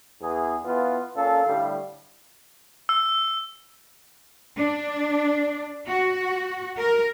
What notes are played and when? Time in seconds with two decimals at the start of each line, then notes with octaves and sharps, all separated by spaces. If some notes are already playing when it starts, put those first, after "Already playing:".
0.21 E2 G#4
0.64 E3 B3 F4
1.16 A#2 C#4 A4 F5
1.46 A2 D3 G3
2.89 E6
4.58 D4
5.88 F#4
6.78 A#4